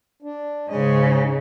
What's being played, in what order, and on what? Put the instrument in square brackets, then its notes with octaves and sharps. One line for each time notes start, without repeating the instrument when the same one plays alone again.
[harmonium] D4
[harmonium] G#2 G#3 D#5 [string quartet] C#3